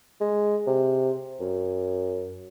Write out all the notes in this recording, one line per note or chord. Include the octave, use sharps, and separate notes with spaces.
G#3
C3
F#2